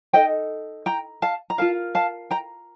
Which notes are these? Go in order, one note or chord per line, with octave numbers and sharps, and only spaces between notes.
D#4 A4 D#5 G5
G5 A#5
F5 A5
A#5
F4 A#4 F5 A5
F5 A5
G5 A#5